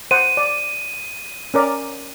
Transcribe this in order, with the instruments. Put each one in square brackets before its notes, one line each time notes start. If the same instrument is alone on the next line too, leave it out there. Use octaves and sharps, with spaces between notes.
[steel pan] C5 F#5 [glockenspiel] D#7
[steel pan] D5
C#4 A#4 D5